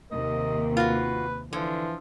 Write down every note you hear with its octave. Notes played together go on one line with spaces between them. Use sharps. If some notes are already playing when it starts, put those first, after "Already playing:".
D#2 C3 A#4 D#5
F4 F#4 B4
D3 E3 F3